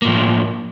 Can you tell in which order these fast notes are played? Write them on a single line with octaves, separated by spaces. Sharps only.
A#3 A2 F3